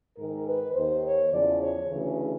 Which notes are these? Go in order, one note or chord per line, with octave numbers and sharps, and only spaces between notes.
G#2 D#3 A#4
B4
D#2 D#3 C5
C#5
E2 C#3 F3 D5
C#5
D2 C#3 E3